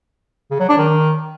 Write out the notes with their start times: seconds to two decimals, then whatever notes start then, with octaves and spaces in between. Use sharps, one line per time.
0.51 C#3
0.60 F#3
0.69 D4
0.78 D#3